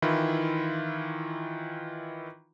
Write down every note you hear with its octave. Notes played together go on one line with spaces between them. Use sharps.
D#3 E3 E4 F4